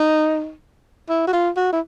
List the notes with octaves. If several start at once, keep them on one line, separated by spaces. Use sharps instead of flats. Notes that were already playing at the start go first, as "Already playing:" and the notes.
Already playing: D#4
E4
F#4
F4
F#4
E4